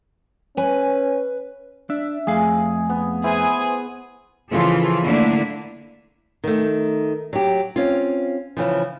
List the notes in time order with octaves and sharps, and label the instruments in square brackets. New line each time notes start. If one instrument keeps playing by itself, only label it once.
[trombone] C#4 [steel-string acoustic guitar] B4 G#5
[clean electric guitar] D4 [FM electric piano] E5
[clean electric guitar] F2 A3 F5 [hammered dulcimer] G#4
[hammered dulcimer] B3
[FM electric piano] E4 B4 C5 [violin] G#4 G#5
[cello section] C#3 E3 F3 F4 G#4 A4
D3 A3 A#3 D4 E4
[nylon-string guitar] D#3 A3
F#3 G4
C4 C#4 F4
C#3 E3 F3